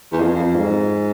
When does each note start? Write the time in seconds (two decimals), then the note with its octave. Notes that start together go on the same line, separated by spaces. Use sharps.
0.12 E2
0.20 F2
0.35 F2
0.56 G#2